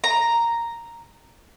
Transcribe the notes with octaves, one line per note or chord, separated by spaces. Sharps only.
A#5